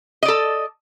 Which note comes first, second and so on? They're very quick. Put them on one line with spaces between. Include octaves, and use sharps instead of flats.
D#5 D5 A4